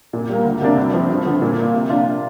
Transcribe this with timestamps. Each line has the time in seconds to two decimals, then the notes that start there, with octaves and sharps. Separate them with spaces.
0.13 A#2
0.30 G3 A#3
0.45 D2
0.62 C3 A#3 D4
0.77 G2
0.94 F3 C4
1.10 G2
1.25 D3 F3
1.42 A#2
1.58 A#3 F4
1.74 C3
1.89 A#3 D4 F4